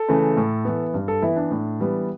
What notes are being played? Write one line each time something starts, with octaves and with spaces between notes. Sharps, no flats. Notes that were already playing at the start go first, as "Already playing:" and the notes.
Already playing: A4
C#3 E3 A3
A2
E3 B3
G2
A4
E3 B3 E4
D4
A2
E3 G3 B3